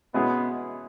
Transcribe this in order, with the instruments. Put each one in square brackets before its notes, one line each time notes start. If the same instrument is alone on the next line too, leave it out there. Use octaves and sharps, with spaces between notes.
[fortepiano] B2 G#3 C#4 E4 G#4 [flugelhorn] B3